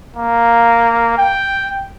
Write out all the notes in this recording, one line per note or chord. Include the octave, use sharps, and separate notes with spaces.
A#3
G5